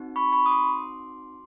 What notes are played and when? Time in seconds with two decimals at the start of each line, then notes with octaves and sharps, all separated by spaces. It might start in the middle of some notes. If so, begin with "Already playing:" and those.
Already playing: C4 D#4 F#4
0.16 B5 C#6
0.33 B5 C#6
0.46 D#6
0.51 C6 D6